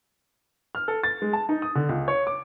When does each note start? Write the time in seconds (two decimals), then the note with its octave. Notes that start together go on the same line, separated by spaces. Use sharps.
0.75 F6
0.88 A4
1.04 A6
1.22 G#3
1.33 A5
1.49 D#4
1.62 D#6
1.75 D3
1.89 C#2
2.08 C#5
2.27 D6